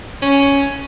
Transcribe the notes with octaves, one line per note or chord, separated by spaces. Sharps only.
C#4